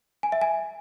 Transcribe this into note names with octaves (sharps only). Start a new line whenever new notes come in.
G#5
E5
G#5